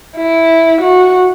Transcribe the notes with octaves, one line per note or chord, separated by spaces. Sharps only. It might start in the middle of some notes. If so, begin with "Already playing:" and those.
E4
F#4